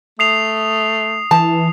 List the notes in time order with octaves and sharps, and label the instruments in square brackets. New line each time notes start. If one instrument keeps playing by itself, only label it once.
[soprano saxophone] A3 [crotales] D#6 C7 F7
[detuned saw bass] E3 [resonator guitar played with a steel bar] A5